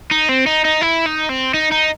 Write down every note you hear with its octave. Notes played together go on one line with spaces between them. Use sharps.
D#4
C4
D#4
D#4
E4
D#4
C4
D#4
D#4